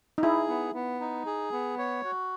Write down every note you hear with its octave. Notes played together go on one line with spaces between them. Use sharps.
D#4
E4 G#4
B3
B3
D#4
G#4
B3
C#5
F#4